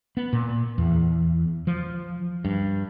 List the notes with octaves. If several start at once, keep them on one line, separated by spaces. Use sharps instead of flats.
B3
A#2
E2
F3
G2